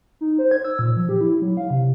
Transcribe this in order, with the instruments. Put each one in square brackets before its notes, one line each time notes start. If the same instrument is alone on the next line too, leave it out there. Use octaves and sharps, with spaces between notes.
[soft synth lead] D#4
C5
G#6
E6
A#2
F3
G4
E4
F#3
F5
C3